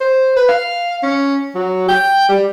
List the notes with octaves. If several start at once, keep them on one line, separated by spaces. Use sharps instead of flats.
C5
B4
F5
C#4
F#3
G5
G3